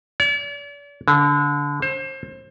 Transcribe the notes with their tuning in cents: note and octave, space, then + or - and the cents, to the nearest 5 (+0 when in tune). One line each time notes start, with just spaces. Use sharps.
D5 -45
D3 -25
C5 +30